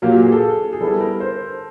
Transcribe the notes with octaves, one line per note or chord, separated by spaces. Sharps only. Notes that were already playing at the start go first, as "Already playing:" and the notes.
A#2 F#3 A#3 G4
G4
G#4
A4
G#4
G3 B3 E4 A4
A#4
C5